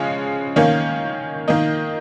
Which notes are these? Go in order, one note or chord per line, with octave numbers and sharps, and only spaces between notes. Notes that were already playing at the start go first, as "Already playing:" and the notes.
Already playing: C#3 F3 G#3 C#4
D#3 A#3 C#4
D#3 A#3 D#4